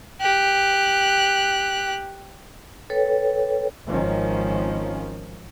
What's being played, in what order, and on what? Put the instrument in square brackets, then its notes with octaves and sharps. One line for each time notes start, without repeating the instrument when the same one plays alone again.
[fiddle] G4 F#6
[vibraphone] A4 B4 C#5 G5
[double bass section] G#1 D#3 F3 C#4